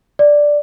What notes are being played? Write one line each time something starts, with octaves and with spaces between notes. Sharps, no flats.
D5